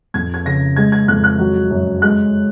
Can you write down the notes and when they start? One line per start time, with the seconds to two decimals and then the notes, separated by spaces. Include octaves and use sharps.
0.14 F2 G#6
0.34 G#6
0.45 C#3 A#6
0.76 G#3 G#6
0.92 G#6
1.08 F2 F#6
1.24 F#6
1.39 F#3
1.71 F#2
2.02 G#3 F#6